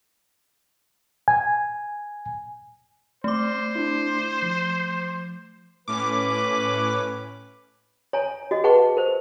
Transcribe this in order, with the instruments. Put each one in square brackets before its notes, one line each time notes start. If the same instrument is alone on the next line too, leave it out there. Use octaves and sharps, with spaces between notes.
[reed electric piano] G#5
[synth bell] A3 D6 [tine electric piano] C4 [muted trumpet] C5
[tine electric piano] D4 E4
F3
[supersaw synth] A2 C#4 [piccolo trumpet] B4 [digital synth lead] D6
[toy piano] C#5 G#5 A#5
F#4 D#5
G#4 B4 F#5 A5 C#6
A#4 C5